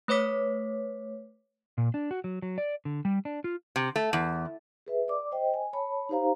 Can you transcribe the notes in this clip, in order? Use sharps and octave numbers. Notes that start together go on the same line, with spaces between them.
A3 B4 C#5 D6 B6
A#2
D4
F#4
F#3
F#3
D5
D3
G3
D4
F4
C3
A3
E2
G#4 B4 E5
D5 D6
C5 D#5 G5
G#5
C#5 A5 B5
D#4 G4 C5 F5 A#5